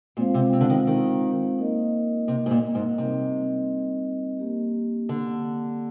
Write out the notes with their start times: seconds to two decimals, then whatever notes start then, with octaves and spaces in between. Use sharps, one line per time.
0.17 A#2 G#3 C4 F4 C5 F5
0.34 C3
0.53 C3
0.61 D3
0.69 D#3
0.87 D#3
1.58 A#3 D#4 A#4 D#5
2.28 C3
2.46 G#2
2.51 A#2
2.75 G#2
2.98 C3 G3 C4 D#4 A#4 D#5
4.40 A#3 D4 G4
5.09 D3